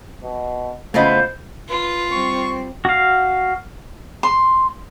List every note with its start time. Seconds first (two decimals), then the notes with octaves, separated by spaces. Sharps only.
0.23 B2
0.94 C#3 E3 A3 B3 F4 C5 D#5
1.69 F4 B4
2.12 G3 C4 C#6
2.85 F#4 F5
4.23 C6